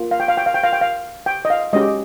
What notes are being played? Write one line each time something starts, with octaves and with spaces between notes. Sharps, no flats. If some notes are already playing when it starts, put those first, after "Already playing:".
Already playing: A#3 F4
F5
G5
F5
G5
F5
G5
F5
G5
F5
G5
D#5
F5
G#3 C#4 G4 D#5